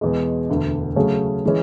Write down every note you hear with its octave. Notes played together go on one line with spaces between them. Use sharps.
E2 B2 G#3
E1 D2 D3
C#3 F#3 A3 C#4 G#4
E3 G#3 C#4